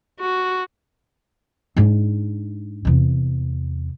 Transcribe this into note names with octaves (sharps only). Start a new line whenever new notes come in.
F#4
G#2 D4
E2 C3